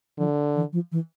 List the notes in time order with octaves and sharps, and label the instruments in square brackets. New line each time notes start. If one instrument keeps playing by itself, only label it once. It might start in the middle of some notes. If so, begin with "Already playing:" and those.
[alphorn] D3 [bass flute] F3
[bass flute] E3
F3
E3